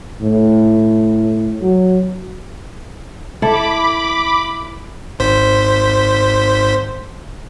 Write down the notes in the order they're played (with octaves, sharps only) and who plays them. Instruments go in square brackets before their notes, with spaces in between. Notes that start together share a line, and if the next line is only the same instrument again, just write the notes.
[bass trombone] A2
F#3
[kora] E4 A4 [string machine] B5 D6
[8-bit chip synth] G#1 C5 B6